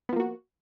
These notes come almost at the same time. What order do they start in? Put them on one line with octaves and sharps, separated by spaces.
B3 F3 A#3 F#4